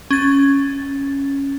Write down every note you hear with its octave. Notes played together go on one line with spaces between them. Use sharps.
C#4 A6